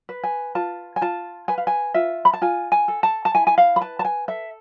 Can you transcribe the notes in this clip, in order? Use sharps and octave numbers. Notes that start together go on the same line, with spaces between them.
B4
G#5
F4 A5
G#5
F4 A5
B4 G#5
F5
G#5
F4 E5
B5
A5
F4 G#5
G#5
A4
A5
A5
E4 G#5
G#5
F5
B5
B4 A5
A5
G#5
A4 E5